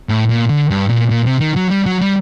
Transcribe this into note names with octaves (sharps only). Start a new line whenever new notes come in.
A2
A#2
D3
G2
A#2
A#2
C3
D#3
F#3
G3
F#3
G3